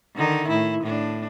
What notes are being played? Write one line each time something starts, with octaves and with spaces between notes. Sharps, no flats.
D3 D#3 D#4
A2 E4
A2 D4